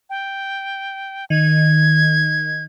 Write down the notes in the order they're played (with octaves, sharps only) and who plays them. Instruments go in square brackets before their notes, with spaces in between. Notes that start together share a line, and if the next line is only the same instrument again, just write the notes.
[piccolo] G5
[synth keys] D#3 [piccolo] G#6